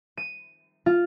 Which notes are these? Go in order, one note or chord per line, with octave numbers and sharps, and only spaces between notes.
D#7
F4